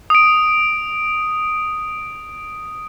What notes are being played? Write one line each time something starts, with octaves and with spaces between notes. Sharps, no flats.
D#6 D7